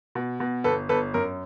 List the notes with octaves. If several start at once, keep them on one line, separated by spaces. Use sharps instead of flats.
B2
B2
G1 A4 B4
G1 A4 B4
F#2 A#4